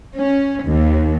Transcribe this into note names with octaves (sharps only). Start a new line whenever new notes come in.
C#4
D#2